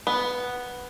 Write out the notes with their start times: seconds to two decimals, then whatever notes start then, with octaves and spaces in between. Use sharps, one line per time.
0.07 B3